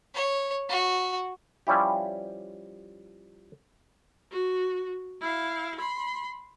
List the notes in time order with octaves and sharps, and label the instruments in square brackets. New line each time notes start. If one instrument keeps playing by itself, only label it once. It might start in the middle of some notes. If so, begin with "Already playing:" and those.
[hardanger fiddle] C#5
F#4
[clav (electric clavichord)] F3 G3 C#4 E4 G4
[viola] F#4
E4 F5
B5 C6